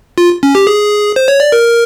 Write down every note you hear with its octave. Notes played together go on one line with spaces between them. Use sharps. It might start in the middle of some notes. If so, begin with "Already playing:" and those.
F4
C#4
G4
G#4
C5
C#5
D5
A#4